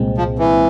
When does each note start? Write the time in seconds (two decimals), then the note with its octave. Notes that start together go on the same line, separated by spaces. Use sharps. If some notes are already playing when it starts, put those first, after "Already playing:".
Already playing: C2 A#2 G#3 C4
0.17 F3
0.38 E3